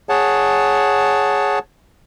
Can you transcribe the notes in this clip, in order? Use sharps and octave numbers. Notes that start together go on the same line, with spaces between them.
G#4 C#5 F#5 A5